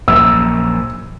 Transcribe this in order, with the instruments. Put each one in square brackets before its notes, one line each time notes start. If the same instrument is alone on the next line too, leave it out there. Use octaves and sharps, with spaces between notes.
[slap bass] A#1 F#2 [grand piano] E6